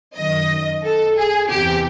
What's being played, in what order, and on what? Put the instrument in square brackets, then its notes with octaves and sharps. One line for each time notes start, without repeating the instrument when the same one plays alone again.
[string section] F#2 D#3 D#5
A4
G#4
E2 C3 E3 G4